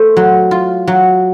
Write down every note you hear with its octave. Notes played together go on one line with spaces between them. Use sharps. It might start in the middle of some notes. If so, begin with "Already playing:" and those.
Already playing: A3 C5
F#3
F4
F#3